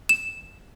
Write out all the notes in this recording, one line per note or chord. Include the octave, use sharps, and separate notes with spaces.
E7